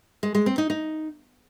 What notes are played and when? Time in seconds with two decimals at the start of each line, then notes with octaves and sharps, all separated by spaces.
0.23 G#3
0.35 G#3
0.46 C4
0.58 D#4
0.70 D#4